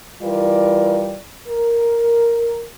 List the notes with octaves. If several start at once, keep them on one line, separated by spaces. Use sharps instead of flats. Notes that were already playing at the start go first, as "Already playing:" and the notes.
E3 G3 F4 A#4 D5
A#4